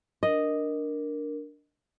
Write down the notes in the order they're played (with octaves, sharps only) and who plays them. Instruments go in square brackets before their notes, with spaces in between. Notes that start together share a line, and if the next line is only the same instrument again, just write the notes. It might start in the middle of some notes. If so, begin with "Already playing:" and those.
[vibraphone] D4 A#4 [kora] D#5